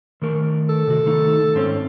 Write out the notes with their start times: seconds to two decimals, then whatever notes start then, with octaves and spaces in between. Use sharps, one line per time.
0.22 D#3 A3 A#4
0.69 A4
0.87 C3 F#4
1.06 D#3 A3 D#4
1.55 G#2 C4 C#4